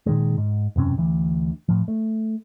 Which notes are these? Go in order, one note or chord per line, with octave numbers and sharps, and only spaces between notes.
A#2 D#3 G#3
G#2
E1 F#2 C3 C#4
D2 E3
A2 F3
A3